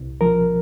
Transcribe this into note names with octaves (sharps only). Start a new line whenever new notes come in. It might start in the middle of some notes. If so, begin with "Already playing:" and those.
Already playing: C2
F3 A#4